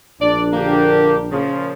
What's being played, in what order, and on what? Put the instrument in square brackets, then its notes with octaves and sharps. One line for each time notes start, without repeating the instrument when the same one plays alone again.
[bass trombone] A#1 [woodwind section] D4 [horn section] D5
[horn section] D3 A#3 G4
A#2 C#3 F3